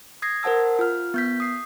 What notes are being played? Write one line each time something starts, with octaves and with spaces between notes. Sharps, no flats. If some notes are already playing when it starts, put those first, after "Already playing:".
D#6 G#6 A#6 C7
A#4 C5 F#5 A5 E6
F4 F6
B3 G6 B6
D#6 C7